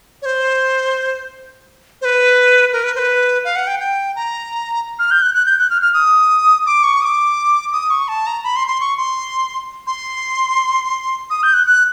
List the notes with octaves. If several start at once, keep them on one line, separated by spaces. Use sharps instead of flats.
C#5
C5
C5
B4
A#4
B4
C5
B4
F5
F#5
G5
G5
A#5
F6
G6
F#6
F#6
G6
F#6
F6
F6
D#6
D6
C#6
D#6
D6
D#6
C#6
A5
A#5
B5
C6
C6
C#6
C6
C6
D#6
G6
F#6
F#6